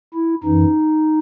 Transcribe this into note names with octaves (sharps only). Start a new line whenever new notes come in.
E4
F#2 E3 D#4